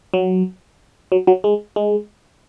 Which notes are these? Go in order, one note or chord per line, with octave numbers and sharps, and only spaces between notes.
F#3
F#3
F#3
G#3
G#3